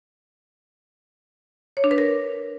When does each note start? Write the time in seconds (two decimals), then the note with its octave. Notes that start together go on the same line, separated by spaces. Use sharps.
1.77 C#5
1.84 D4
1.91 B4
1.98 A#4